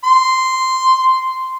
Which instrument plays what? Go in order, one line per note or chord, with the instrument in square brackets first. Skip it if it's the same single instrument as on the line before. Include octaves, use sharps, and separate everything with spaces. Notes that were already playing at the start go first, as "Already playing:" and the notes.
[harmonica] C6